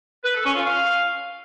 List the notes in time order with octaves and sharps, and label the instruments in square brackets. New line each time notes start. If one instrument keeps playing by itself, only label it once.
[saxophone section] B4
A4
C#4
F4
F5